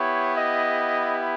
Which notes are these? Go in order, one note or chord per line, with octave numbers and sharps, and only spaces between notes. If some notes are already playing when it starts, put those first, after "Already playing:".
Already playing: B3 E4 G4 C#5
D#5